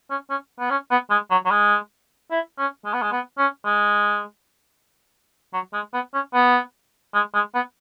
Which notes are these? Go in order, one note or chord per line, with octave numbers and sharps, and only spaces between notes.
C#4
C#4
B3
C#4
B3
G#3
F#3
F#3
G#3
E4
C#4
G#3
B3
G#3
B3
C#4
G#3
F#3
G#3
B3
C#4
B3
G#3
G#3
B3